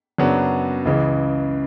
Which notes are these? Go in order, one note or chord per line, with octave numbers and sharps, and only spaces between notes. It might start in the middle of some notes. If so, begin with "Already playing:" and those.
F#2 C#3 F#3 B3 D4
C#2 C#3 E3